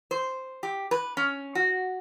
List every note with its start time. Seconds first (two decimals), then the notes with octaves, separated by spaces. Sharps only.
0.11 C5
0.63 G4
0.91 B4
1.17 C#4
1.55 F#4